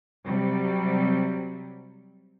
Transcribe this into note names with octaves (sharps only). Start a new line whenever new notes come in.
C3 F#3 G3